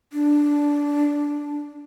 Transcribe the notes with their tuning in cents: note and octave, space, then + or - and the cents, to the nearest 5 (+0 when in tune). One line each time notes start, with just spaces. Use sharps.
D4 -10